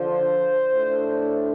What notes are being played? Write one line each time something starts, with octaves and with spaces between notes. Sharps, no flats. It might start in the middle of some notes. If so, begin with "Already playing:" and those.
Already playing: D3 F3 D4 C5
A2 A3 D4